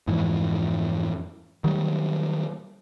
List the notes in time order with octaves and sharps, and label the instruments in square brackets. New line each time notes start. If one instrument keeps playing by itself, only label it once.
[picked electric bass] F2 G#2 E3
D#3 F#3 G3